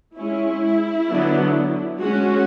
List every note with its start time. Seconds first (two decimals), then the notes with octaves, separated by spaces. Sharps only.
0.17 G#3 C#4 E4
1.08 D3 F#3 B3 D4
1.99 G#3 C#4 F#4